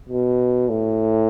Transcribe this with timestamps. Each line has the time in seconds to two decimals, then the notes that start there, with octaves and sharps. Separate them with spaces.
0.09 B2
0.69 A2